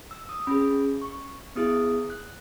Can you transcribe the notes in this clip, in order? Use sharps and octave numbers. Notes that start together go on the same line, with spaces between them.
E6
D#6
C#4 G#4 B5
C#6
B3 E4 G#4 D#6
F#6